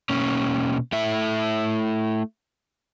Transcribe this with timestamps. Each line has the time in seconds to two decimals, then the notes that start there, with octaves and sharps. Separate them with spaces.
0.10 B2 A#3 C#4
0.92 A3 E4 E5